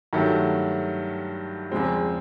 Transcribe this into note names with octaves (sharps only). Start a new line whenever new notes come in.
G2 D#3 F#3 A3
E2 C#3 F3 G#3 C4